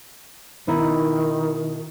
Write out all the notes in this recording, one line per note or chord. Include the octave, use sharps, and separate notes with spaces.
B2 D#3 D#4 E4